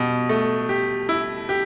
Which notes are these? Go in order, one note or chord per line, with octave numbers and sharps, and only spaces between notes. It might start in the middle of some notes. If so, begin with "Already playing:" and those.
Already playing: B2 G4
A3
G4
E4
G4